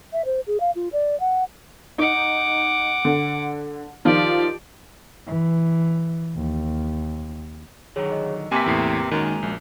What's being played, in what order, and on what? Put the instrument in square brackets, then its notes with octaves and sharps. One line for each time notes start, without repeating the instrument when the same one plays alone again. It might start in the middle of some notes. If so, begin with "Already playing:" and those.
[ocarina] E5
C5
G#4
F5
F4
D5
F#5
[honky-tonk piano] D#4 [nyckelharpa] F#5 D6
[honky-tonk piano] D3
[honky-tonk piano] D#3 F3 F4 [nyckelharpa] G4 D5
[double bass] E3
D#2
[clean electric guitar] D3 D#3 F#3 [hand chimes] G#4 C#5
[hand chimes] D#5
[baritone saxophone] C3 [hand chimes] A#3 D6 [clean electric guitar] A#4 B4 E5 [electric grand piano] G#5 B6
[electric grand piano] E2 A2 C7
[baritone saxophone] F#2 [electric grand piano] D#3 [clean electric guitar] G#3 G#5 A#5
[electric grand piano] A#1 [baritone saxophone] F#2